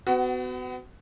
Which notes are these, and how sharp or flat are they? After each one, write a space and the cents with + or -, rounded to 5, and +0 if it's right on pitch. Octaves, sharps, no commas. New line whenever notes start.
B3 +35 F#4 +15